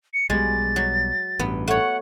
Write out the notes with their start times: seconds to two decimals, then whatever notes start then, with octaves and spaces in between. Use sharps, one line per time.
0.14 C#7
0.30 B1 B2 G3 G#3 A6
0.76 F#3
1.39 A1 G2 B3
1.68 A3 C#5 F#5